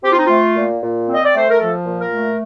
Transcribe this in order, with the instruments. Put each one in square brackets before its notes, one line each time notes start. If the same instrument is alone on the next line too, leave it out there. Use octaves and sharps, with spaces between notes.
[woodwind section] C4 G4
F4
D#4
A3 F4
A#2
A#2
C4
D#5
D5
A3 C5
A#4
F3 A4
A#2
A#4
A3